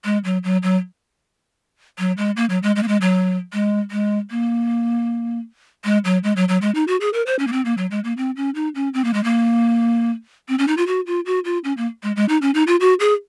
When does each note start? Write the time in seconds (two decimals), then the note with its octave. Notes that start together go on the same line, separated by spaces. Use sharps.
0.05 G#3
0.25 F#3
0.44 F#3
0.63 F#3
1.99 F#3
2.17 G#3
2.37 A#3
2.50 F#3
2.63 G#3
2.76 G#3
2.83 A#3
2.88 G#3
3.01 F#3
3.53 G#3
3.91 G#3
4.31 A#3
5.85 G#3
6.05 F#3
6.24 G#3
6.36 F#3
6.49 F#3
6.62 G#3
6.75 D#4
6.88 F#4
7.01 G#4
7.13 A#4
7.26 C5
7.39 C#4
7.47 A#3
7.52 C4
7.65 A#3
7.77 F#3
7.91 G#3
8.04 A#3
8.17 C4
8.36 C#4
8.55 D#4
8.75 C#4
8.94 C4
9.04 A#3
9.14 G#3
9.24 A#3
10.49 C4
10.59 C#4
10.68 D#4
10.77 F4
10.87 F#4
11.07 F4
11.26 F#4
11.45 F4
11.64 C#4
11.77 A#3
12.03 G#3
12.16 G#3
12.29 D#4
12.42 C#4
12.54 D#4
12.67 F4
12.80 F#4
13.00 G#4